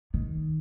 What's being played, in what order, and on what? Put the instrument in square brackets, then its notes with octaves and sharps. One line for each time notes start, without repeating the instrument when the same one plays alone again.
[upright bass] D#3